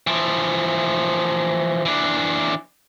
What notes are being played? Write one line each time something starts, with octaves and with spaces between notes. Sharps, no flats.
E3 F3
E3 D4